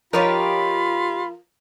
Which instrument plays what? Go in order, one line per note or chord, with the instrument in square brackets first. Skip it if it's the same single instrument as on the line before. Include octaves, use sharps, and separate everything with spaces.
[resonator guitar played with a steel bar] F3 A#4 [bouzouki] D#4 G4 C#5 [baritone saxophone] F4 [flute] B5